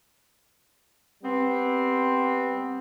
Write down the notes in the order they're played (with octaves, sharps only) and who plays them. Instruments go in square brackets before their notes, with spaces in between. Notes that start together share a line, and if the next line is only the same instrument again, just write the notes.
[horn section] G3 B3 C4